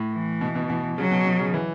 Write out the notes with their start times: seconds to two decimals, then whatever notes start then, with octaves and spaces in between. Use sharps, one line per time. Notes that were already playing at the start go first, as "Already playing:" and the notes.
Already playing: A2
0.13 E3
0.41 B2
0.55 B2
0.70 B2
0.97 C#3 F#3
1.11 B2
1.26 B2
1.39 C#3
1.54 E3